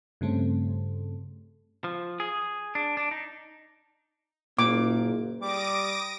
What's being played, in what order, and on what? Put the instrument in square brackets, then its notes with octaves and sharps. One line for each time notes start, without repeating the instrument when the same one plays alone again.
[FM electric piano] G2 C#3 A3 C4
[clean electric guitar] F3
G#4
D4
D4
D#4
[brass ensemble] F#1 [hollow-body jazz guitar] A#2 [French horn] A#3 [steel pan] D6
[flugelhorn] G3 [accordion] D6 [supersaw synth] D#6 A#6 D7